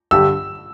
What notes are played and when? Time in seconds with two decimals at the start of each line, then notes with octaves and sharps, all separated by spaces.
0.11 G2 D3 G3 D4 G4 E6